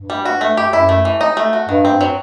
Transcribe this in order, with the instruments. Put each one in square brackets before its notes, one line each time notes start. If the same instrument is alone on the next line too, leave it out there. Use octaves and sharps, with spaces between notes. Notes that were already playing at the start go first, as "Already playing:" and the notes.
Already playing: [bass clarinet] G2
[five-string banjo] G3
F#4
A3
G4
[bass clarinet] F#2 [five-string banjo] E4
[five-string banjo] A3
E3
D#4
A3
F#4
[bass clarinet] G2 [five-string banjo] D#3
[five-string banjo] C4
F#3